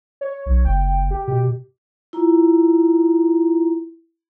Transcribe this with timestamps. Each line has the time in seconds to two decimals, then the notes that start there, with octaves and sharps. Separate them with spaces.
0.21 C#5
0.46 B1
0.65 F#1 G5
1.11 G4
1.28 B2 G4
2.13 E4 F4 A#5